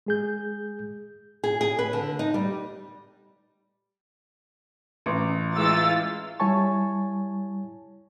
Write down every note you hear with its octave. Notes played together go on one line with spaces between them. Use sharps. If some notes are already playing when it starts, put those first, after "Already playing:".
G#3 G#4 G6
G#4
G#4
B4
D3
D#4
G3
A1
E3 G#3 F4 E6 A6
G3 E4 C#5 G#5 A5 C#6